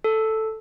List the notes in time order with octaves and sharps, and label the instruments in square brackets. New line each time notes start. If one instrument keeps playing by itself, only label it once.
[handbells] A4